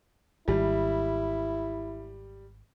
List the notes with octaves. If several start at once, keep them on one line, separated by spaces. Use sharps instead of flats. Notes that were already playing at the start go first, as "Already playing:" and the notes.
G#1 G3 E4